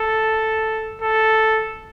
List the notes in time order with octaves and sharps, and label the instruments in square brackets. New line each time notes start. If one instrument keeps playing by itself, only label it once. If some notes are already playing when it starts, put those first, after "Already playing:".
Already playing: [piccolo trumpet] A4
A4